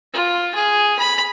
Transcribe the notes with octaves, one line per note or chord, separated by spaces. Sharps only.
F4
G#4
B5